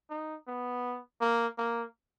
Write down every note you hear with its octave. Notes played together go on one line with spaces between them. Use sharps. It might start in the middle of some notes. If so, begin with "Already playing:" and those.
D#4
B3
A#3
A#3